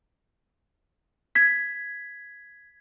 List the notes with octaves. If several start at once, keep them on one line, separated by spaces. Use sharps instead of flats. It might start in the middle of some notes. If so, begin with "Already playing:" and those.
G#6 B6